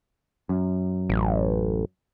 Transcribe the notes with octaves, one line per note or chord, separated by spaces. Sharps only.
F#2
A1